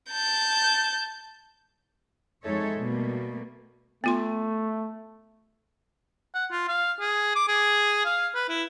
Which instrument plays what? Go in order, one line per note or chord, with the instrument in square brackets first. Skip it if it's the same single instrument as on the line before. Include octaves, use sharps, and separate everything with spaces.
[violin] A5 G6
[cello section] F2 G#3 D#4 A4 C#5 E5
B2 G3 A3 A#3
[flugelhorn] A3 [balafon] B3 F4 C6
[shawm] F#5
F4
F5
G#4
D6
G#4
F5
B4
E4